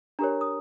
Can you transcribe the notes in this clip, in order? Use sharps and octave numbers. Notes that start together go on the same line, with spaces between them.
D4 G4 A#4 C#5 A#5
D#6